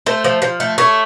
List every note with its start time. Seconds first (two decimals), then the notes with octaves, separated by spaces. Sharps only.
0.06 A3 C5
0.24 F3
0.42 F3
0.60 A3
0.78 A3 C#5